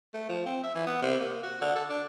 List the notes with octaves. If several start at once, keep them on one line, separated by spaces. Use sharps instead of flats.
A3
F3
C4
E5
E3
B3
C3
A#3
F#4
D3
A4
D4